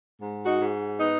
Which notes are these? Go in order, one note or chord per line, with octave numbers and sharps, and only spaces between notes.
G#2
D#4 F#4
G#2
B3 D#4